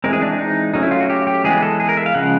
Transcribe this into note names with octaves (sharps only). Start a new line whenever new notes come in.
E3 G#3 C4 A#4
G#4
D4
D#4
F#3 A3 C#4 D#4
E4
F4
F#4
G4
G4
E3 G#3 B3 G#4
A4
G#4
A#4
E5
F5
C#3 F3 G#3 F#5